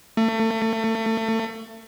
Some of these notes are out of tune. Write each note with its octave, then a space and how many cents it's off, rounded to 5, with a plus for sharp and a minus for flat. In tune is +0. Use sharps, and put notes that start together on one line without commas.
A3 +30